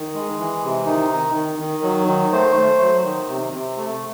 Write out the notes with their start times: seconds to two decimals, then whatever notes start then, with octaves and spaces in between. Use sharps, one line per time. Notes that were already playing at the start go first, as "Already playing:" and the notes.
Already playing: D#3
0.14 G#3
0.38 E3
0.62 C3
0.86 D#3 D#4
1.11 D#3
1.35 D#3
1.59 D#3
1.83 F#3
2.08 D#3
2.32 A3 C5
2.56 A3
2.80 F#3
3.04 D#3
3.28 C3
3.53 C3
3.77 A3